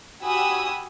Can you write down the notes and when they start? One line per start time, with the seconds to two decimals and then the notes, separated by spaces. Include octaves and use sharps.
0.22 F#4 G4 G#5 B5 D#6 E6